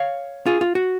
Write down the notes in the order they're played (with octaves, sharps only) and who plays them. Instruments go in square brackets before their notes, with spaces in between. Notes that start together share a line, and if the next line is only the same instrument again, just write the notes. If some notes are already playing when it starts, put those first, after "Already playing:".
Already playing: [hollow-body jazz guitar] C#5 F5
F4 G#4
F4
F#4